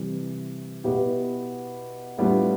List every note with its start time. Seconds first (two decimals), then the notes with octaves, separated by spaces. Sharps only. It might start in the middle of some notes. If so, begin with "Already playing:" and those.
Already playing: C3 E3 G3
0.84 B2 B3 E4 G4
2.18 A2 G3 B3 D4 F4